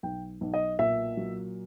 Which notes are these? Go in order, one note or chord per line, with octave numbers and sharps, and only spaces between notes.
B1 G5
B1
D#5
A#2 E5
F#3